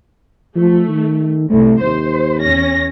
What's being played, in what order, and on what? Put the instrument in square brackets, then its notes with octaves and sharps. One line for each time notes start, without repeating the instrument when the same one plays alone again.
[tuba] F3 [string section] A3
[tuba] D#3
[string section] C2 [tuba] A3
[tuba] D#2 [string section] C5
[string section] E2 C#4 A#6